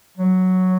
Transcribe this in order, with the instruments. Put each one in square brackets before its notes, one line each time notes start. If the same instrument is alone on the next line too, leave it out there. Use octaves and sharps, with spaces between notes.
[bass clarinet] F#3